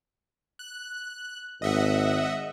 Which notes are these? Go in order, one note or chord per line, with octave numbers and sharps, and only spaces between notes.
F#6
G#1 D#5 E5 F#5